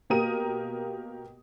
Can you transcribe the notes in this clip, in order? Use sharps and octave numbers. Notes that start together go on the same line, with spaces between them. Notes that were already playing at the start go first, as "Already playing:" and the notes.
B2 A#3 G4 A#4 D#6 D#7